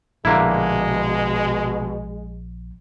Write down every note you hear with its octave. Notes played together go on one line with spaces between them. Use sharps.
A#1 B2 D3 G#3 A#3 E4